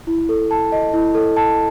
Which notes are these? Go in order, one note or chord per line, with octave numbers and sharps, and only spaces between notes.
E4
A4
A5
D#5
E4
A4
A5